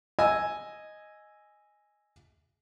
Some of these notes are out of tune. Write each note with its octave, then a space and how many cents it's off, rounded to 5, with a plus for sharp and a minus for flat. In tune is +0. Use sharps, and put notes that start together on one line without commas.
D#5 +0 G#5 +0 E6 +0